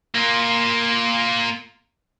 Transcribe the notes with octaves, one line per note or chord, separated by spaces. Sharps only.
A#3 F4